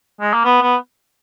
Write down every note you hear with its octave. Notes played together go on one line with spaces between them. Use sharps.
G#3
A#3
B3
B3